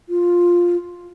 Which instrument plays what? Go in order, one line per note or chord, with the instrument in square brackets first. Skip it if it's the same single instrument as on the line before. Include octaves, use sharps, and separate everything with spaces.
[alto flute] F4